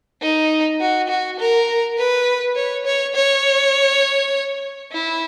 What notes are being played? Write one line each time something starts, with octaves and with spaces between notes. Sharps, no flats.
D#4
F#4
F#4
A#4
B4
C#5
C#5
C#5
E4